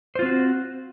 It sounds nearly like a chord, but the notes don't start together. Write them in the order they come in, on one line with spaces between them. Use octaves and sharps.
C5 F4 C4 F#4